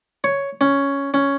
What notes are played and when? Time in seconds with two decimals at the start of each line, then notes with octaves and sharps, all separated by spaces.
0.24 C#5
0.61 C#4
1.14 C#4